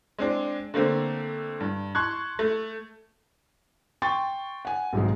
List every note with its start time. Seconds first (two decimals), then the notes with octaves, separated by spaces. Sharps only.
0.18 G#3 C4 D4
0.74 D3 A3 A#3 C4
1.60 G2
1.95 A5 C6 C#6 F#6 G#6
2.39 A3
4.02 G5 C6 C#6 A6
4.65 F#5 G#5
4.93 B1 G#2 C3 D#3 G#3